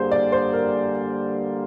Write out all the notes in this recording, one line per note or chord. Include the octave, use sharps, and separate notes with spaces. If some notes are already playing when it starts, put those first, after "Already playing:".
Already playing: D3 G3 A#3 G#4 C5
D5
C5
A#4